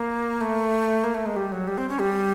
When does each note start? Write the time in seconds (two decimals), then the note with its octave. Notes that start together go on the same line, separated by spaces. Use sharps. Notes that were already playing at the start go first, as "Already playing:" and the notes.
Already playing: A#3
0.41 A3
1.04 A#3
1.14 A3
1.26 G#3
1.36 G3
1.52 F#3
1.67 G3
1.78 C4
1.89 C#4
1.99 G3